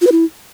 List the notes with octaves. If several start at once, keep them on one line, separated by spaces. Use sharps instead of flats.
F4
B4
E4